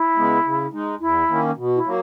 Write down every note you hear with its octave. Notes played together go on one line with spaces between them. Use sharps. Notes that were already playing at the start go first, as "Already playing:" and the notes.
Already playing: E4
C#3 G#3 B3
C#3
G#3 D#4
E2 E4
D#3 A#3 C#4
B2
E4
F#3 A#3